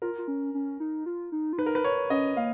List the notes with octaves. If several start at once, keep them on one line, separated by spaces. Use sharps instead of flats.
F4 A#4
F4
C#4
C#4
D#4
F4
D#4
F4
D#4 B4
A#4
B4
C#5
C#4 D#5
A#3 F5